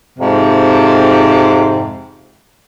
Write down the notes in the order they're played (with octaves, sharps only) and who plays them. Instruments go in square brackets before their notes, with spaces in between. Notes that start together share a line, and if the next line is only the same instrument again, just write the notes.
[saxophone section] F2 G#2 C3